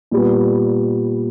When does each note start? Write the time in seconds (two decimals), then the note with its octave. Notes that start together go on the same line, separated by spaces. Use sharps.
0.11 A#2 G3 B3